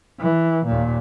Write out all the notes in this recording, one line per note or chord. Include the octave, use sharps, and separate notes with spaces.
E3
D#2 A#2